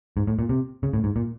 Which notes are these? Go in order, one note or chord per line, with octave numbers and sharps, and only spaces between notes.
G#2
A2
A#2
C3
C#3
A2
G#2
A#2